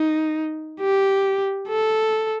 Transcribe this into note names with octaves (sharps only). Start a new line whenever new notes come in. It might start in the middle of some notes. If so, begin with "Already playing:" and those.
Already playing: D#4
G4
A4